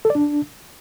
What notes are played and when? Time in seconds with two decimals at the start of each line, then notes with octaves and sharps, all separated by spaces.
0.05 A4
0.10 D5
0.15 D4